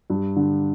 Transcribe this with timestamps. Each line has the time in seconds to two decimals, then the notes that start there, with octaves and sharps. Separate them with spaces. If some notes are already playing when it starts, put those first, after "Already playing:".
0.10 G2
0.36 D3